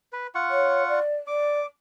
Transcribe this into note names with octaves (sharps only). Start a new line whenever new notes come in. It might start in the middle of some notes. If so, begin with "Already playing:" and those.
B4
F4 F#5 C#6
C#5
D5
D5 D6